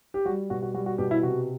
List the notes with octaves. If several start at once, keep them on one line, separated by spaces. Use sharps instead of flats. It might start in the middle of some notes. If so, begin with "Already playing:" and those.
G4
G3 F#4
B2 F#4
F#4
G3 F#4
F#4
B2 G4
E4
C3 F#4